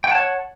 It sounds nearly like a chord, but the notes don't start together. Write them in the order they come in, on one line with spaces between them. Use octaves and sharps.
G5 F#5 A5 C#5